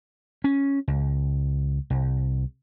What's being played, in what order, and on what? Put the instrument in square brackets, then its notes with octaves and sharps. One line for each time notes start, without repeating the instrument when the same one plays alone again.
[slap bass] C#4
C#2
C2